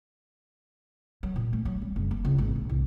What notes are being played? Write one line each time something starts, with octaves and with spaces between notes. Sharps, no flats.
F#3
A#2
A3
F#3
G3
F#1
A#3
C#2
G#1
A#1
C2